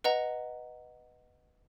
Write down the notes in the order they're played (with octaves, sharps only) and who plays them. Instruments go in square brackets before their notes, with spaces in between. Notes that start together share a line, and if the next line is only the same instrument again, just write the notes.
[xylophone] B4 D#5 F#5 A#5